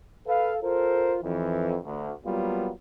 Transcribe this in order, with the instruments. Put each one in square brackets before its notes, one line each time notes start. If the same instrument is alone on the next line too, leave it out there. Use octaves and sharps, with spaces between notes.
[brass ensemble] A4 B4 F5
F4 A4 A#4 C5
F2 E3
D2
F#3 G3 A#3 B3 F4